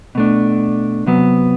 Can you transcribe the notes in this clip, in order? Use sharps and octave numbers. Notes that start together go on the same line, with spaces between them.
B2 A3 D4
C3 F#3 B3